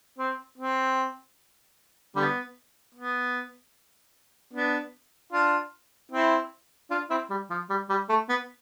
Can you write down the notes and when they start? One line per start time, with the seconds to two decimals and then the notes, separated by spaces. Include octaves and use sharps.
0.18 C4
0.58 C4
2.16 D3 G3 B3
2.94 B3
4.53 B3 D4
5.32 D4 F4
6.11 C4 E4
6.90 D4 F4
7.10 C4 E4
7.30 G3
7.50 F3
7.70 G3
7.89 G3
8.09 A3
8.29 B3